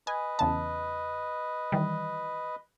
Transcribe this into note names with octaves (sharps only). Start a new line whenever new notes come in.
B4 D#5 G#5
E2 C#3 A5
D#3 E3 G3